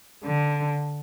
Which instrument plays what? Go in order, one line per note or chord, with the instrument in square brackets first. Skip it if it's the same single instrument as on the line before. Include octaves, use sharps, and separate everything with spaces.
[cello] D3